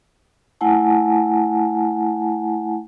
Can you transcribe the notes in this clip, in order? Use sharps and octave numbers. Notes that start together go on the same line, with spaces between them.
A3 E4 F#5 G#5 A5